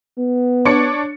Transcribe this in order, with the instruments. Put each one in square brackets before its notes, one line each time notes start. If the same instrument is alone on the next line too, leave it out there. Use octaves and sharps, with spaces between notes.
[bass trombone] B3
[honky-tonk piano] D4 C#5 C#7